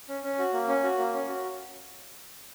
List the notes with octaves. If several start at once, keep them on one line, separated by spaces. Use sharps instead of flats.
C#4
C#4
F#4
A#3
C#4
F#4
A#3
C#4
F#4